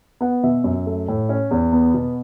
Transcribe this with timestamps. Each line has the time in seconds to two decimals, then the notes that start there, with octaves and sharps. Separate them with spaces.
0.21 B3 F#5
0.43 B2 E5
0.64 F#2
0.87 A3
1.08 A2
1.29 C#4
1.51 E2
1.73 B3
1.94 B2